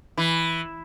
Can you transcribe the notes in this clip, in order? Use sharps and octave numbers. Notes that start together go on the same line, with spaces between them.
E3